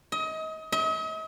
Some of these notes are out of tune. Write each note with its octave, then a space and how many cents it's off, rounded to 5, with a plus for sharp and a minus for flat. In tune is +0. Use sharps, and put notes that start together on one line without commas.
D#5 +30
D#5 +45